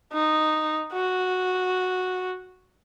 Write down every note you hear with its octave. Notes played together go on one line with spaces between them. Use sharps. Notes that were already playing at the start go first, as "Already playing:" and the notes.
D#4
F#4